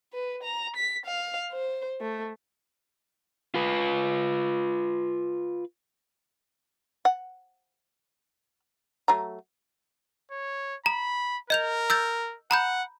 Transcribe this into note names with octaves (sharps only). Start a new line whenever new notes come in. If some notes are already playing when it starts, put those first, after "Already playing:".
B4
A#5
B6
F5
C5
A3
F4 B4
F#5
F#3 A3 A#5
C#5
A#5 B5
A#4 D#5 G6 F7
E6 G6 A6
F#5 A#5 B5 G6